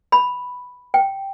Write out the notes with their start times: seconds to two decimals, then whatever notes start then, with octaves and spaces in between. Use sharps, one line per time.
0.12 B5
0.94 G5